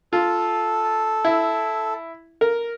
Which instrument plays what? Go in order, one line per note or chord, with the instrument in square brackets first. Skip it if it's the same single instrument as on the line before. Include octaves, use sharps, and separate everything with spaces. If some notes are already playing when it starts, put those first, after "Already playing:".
[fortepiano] F4 [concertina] A4
[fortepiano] E4
A#4